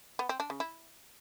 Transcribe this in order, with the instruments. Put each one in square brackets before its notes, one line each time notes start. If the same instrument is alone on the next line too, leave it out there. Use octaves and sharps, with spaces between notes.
[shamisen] B3
C4
D4
C#3
E4